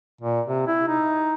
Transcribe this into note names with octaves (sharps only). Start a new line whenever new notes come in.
A#2
C3
E4
D#4